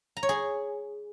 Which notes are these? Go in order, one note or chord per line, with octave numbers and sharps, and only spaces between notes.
A#5
C#5
G#4